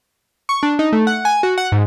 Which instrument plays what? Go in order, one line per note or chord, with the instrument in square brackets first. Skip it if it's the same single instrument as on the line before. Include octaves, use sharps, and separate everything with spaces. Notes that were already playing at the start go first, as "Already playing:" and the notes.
[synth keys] C#6
D4
D#4
A3
F#5
G#5
F#4
F#5
G#2